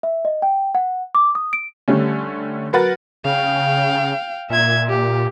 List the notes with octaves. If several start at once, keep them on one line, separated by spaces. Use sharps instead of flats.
E5
D#5
G5
F#5
D6
D#6
D7
D3 G3 A3 C#4
F#3 A#4 B4 F#5 A6
C#3 F5 G5
A#2 E5 G#6
G4